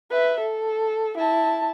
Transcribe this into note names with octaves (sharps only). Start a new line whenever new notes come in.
B4 E5
A4
E4 A5